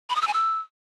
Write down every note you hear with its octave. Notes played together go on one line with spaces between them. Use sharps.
B5
D#6
E6
G#5
E6